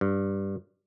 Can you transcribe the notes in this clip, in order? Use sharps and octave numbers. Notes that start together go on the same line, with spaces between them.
G2